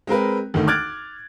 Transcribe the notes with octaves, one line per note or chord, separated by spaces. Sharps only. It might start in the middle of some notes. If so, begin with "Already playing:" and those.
G#3 C4 A#4 B4
G#1 D2 D#3 A3
D6 F6 F#6 G#6 A6 D7